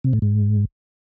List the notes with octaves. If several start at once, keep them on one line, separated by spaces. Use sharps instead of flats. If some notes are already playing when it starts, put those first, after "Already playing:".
C3
A2
G#2